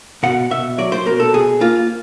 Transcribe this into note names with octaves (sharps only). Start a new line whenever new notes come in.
B2 F#5
B2 E5
F#3 D5
C5
B2 A#4
A4
B2 G#4
A#3 F4